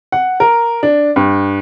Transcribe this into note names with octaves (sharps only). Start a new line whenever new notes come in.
F#5
A#4
D4
G2